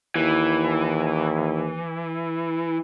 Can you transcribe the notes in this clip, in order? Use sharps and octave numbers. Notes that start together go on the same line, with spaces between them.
D#2 E3